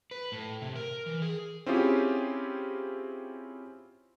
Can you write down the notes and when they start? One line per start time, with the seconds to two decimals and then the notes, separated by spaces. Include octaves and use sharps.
0.11 B4
0.32 A2
0.62 C3
0.76 A#4
1.06 E3
1.22 G#4
1.66 C4 C#4 E4 F4 G4 G#4